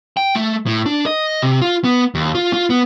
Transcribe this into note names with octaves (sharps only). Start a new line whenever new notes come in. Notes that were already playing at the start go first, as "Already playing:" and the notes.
G5
A3
A2
D4
D#5
C3
F4
B3
D#2
F4
F4
B3